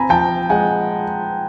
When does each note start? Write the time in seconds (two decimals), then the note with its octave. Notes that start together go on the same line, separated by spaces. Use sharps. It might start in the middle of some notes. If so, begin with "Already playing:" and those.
Already playing: C4 G#5 A#5 B5
0.09 F3 G5 A5
0.50 G#3 F#5 G#5